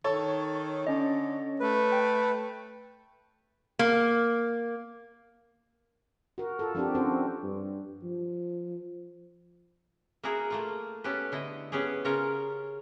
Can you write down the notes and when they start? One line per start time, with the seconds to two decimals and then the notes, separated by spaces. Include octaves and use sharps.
0.04 D#3 A4 C#5
0.87 D3 C#4 D#5
1.60 A3 B4
1.92 G5
3.79 A#3
6.38 F#4 A#4
6.59 F4 A4
6.75 F3 C4 D4 F#4 G4
6.95 C4 C#4 F#4 C5
7.43 G2
8.03 F3
10.23 A#3 E4 F#4 G#4 A#4
10.50 A3 A#3 F4
11.04 B3 C#4 G4 A4 B4
11.32 D3 E4 D#5
11.72 B3 C#4 G4 G#4
12.04 C#3 C#4 F4 A#4 C#5